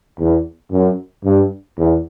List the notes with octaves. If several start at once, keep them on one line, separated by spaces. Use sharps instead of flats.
E2
F#2
G2
E2